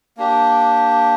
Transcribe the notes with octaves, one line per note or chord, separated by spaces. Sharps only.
A#3 D4 G4